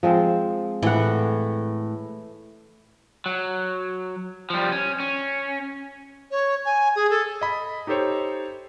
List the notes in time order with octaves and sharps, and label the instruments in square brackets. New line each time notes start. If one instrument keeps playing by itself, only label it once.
[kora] F3 G#3 C4
[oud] A2 [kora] E3 F#5
[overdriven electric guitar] F#3
F3 G3
C#4
C#4
[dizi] C#5
G#5
G#4
A4
[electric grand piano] D#5 B5
D#4 G4 A4 C5 C#5